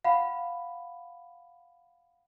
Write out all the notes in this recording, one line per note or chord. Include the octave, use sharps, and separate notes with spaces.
F5 F#5 B5